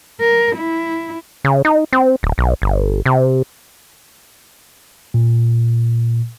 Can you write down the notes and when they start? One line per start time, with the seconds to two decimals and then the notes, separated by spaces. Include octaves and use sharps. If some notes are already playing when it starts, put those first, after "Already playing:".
0.20 A#4
0.56 E4
1.44 C#3
1.65 D#4
1.93 C4
2.23 D1
2.38 B1
2.62 G1
3.06 C3
5.14 A#2